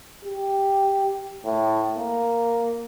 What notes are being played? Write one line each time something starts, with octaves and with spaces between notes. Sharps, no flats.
G4
A2
A#3